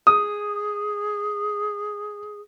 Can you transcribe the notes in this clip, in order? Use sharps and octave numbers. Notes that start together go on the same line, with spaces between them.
G#4 D#6